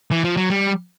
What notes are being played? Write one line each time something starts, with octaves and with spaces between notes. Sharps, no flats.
E3
F3
F#3
G3